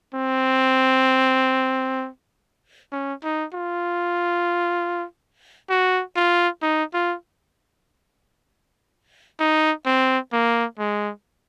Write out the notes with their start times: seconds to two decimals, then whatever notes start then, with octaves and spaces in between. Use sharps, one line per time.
0.15 C4
2.92 C#4
3.24 D#4
3.54 F4
5.70 F#4
6.16 F4
6.62 D#4
6.94 F4
9.40 D#4
9.86 C4
10.33 A#3
10.79 G#3